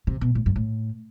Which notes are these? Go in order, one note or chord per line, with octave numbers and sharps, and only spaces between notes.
C3
B2
A2
G2
A2